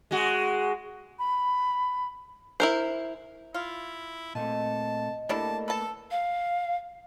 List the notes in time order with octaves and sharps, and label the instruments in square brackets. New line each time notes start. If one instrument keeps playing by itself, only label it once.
[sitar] G#3 F#4
[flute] B5
[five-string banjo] E4 A#4 C5
[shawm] E4 [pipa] F4
[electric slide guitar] A#2 A3 C4 [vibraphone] D#5 [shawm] A5
[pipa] G3 D4 E4 [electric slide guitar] A3 A#3 [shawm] A5
[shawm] A4 [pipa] B4 A5
[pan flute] F5